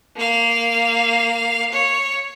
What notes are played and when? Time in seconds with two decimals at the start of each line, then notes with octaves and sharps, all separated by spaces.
0.17 A#3 F5
1.72 C#5